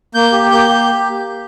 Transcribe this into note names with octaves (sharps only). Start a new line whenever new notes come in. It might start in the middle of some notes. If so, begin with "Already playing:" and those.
A#3 G6
G4
A#3 G6
G4